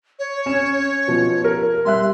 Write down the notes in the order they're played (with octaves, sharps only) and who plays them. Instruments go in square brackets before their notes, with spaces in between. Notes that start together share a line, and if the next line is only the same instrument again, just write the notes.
[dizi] C#5
[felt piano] C#4 E7
B2 F3
A#4
[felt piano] G3 E5 F#6 [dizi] C6